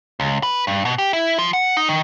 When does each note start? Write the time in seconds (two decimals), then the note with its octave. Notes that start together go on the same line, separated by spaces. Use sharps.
0.20 C#2
0.43 B4
0.67 G2
0.85 B2
0.98 G4
1.13 E4
1.38 F3
1.53 F#5
1.77 D#4
1.89 D#3